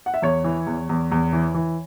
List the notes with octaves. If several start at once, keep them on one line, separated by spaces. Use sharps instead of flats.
F#5
E5
E2 C#5
E3
E2
E2
E2
E3
E3